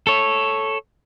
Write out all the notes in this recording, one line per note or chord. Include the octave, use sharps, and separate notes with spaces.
A4 C#5